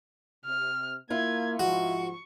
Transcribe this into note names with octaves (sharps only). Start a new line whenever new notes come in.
C3 F6
A#3 E4 F4 G#6
G#2 F3 F#4 C#6